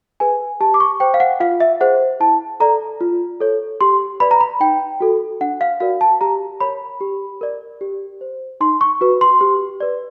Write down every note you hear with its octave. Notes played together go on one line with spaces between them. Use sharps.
G#4 B4 G#5
G4 A5
D6
C#6
C5 G5
F5
F#5
F4 F5
E5
G#4 C5 F#5
E4 A5
A4 D5 A#5
F4
A4 C#5
G4 C6
B4 D5 B5
A#5
B5
D#4 G5
F#4 A4
D4 F#5
F5
F#4 A#4 D5 F5
A5
G4 A#5
A#4 C#5 B5
G4
A#4 D5
G4
C5
D#4 C6
C#6
F#4 B4
C6
G4
B4 D5